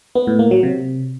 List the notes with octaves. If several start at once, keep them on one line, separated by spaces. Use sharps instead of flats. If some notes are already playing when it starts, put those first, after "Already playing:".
B3
A2
A#3
F#3
C3